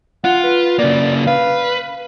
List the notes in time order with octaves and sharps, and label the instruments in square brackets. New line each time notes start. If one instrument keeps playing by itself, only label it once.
[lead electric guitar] F4 [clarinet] F#5
[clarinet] B4
[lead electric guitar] C#3 A#3 [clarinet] D5
[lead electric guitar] B4 [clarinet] F5